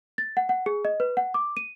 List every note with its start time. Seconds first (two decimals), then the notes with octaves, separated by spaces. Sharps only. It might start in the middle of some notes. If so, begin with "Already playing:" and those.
0.18 A6
0.37 F#5
0.49 F#5
0.66 G#4
0.85 D#5
1.00 B4
1.17 F#5
1.34 D6
1.57 D#7